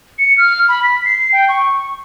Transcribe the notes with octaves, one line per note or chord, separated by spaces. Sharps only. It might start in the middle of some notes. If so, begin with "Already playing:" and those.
C#7
F6
B5
B6
C7
G5
C#6